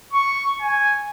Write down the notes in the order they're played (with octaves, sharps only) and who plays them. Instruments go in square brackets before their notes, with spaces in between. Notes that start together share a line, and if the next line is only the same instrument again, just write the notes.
[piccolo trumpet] C#6
G#5